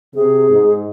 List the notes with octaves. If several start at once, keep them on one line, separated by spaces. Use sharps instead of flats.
C3 G#4
G#2